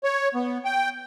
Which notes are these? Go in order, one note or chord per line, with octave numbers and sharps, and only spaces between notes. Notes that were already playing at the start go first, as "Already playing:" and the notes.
C#5
B3
G5